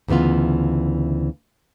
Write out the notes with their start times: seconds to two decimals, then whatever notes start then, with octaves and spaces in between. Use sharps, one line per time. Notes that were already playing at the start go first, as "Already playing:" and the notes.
0.08 D2 C#3 E3 B3 F4